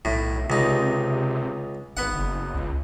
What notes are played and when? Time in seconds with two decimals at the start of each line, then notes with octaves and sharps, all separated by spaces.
0.05 B1 A2
0.50 C#2 C3 D#4
1.97 G#1 B3 F#5
2.15 F#1
2.54 C#2